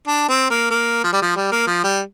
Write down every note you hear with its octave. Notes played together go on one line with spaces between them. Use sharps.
D4
C4
A#3
A#3
F3
G3
F3
G3
A#3
F3
G3